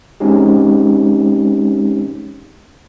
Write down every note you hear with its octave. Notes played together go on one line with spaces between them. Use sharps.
G#3 C4 C#4 D#4 G4